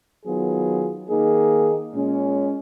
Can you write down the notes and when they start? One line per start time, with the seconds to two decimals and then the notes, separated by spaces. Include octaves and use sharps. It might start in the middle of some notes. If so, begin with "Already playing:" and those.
0.25 D#3 F#3 B3 F4 G#4
1.09 D#3 A#3 D#4 G#4
1.92 A#2 G#3 C#4